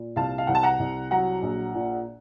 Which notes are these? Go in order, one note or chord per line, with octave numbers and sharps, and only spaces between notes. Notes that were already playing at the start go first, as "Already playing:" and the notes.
Already playing: A#2
C2 F5 A5
F5
C2 F#5
A5
F#5 A#5
C2
F#3 F#5 A#5
A#1
A#2